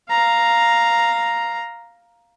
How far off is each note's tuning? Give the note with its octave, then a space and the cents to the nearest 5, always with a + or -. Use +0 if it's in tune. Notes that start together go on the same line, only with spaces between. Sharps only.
F5 +0 A#5 +0